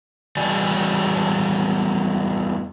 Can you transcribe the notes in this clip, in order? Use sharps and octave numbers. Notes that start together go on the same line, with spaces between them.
E2 E3 G3 F#4 D5 G#5